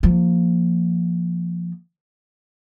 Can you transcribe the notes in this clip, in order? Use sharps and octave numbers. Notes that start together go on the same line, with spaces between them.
F3 A#3